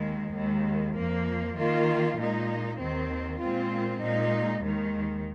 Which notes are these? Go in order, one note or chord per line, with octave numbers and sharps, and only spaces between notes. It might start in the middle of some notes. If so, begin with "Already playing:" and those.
Already playing: D#2 D#3 G#3
D#2 D#3 G#3
F2 F3 A#3
D#3 A#3 F4
A#2 G#3 D#4
D#2 D#3 C4
A#2 G#3 C4 F4
A#2 G#3 D#4
D#2 D#3 G#3